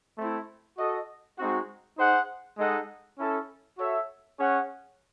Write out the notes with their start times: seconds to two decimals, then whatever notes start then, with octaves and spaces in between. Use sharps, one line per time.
0.18 A3 C4 E4
0.78 F#4 A4 D#5
1.38 G#3 C4 D#4 F#4
1.98 D#4 G#4 C5 F#5
2.58 G#3 D#4 A4 D#5 F#5
3.19 C#4 E4 A4
3.78 F#4 A4 C#5 E5
4.39 C#4 G#4 C#5 F#5